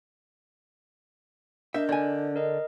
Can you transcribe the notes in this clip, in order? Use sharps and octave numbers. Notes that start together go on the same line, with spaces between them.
D4 A#4 D#5 E5 G6
D3 G#5
A#4 D#5